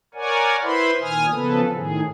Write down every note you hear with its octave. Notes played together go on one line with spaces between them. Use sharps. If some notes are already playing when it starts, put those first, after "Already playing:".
A#4 C#5 D5 F#5 G#5
E4 B4 C5 E5 B5 C6
A#2 D#3 G#5 D#6 F6
C#3 F3 B3 A4 B4
A2 D#3 G#4